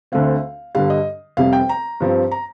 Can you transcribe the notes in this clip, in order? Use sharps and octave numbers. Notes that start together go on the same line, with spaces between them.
D2 D3 A3 C4 F5
G2 D3 G3 F5
D#5
F1 F2 C3 G3 F5
G5
A#5
G2 F3 C4
A#5